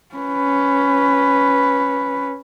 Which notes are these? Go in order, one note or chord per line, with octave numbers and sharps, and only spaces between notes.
C#4 B4